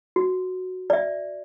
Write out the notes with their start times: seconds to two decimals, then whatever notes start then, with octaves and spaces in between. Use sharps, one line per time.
0.16 F#4
0.90 D5 E5